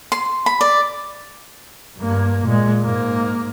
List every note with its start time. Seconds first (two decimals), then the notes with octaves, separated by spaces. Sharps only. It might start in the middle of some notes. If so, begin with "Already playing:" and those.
0.12 C6
0.46 B5
0.61 D5
1.98 G2 A#3
2.45 A#2 G#3
2.84 G#2 A#3